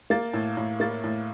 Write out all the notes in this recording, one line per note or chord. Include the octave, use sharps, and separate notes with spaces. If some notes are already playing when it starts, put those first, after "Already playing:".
A#3 A6
A2
A2
A#3 A6
A2